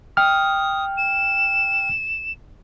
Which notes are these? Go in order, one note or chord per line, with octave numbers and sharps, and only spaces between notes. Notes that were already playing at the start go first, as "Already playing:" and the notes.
G5 D#6 F6
E7